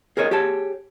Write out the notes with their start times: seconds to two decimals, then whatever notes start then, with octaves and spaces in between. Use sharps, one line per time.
0.17 G#4 A#4 C#5 D#5
0.31 G4 G#4 C#5 A5